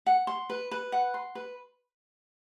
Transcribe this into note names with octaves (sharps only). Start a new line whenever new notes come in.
F#5
C6
B4
B4
F#5
C6
B4